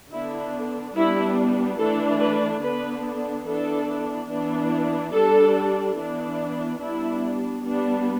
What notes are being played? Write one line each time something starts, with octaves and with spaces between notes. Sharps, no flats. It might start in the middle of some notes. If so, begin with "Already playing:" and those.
D3 B3 D4 E4
G3 B3 D4 E4
E3 A3 D4 A4
B4
D3 B3 D4 B4
E3 B3 D4 A4
E3 B3 D4
G3 D4 A4
E3 B3 D4
G3 B3 D4 E4
G3 B3 D4